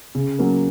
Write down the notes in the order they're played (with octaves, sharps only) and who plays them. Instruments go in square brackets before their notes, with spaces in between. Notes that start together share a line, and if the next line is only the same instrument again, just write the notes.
[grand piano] C#3
F#3 A#3 C#4